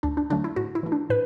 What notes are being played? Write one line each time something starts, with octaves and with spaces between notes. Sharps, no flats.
D2 D4
D4
D3 F#3 A3 D4
E4
A2 F#4
E4
E3 A3
D4
A2 B4